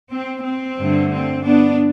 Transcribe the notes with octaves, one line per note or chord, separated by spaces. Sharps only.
C4
C4
G2 D3 A3
C4
B3 D4